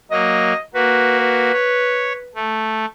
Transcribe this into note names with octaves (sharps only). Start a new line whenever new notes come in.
F#3 A#3 D#5
A#3 F#4 B4
B4
C#5
A3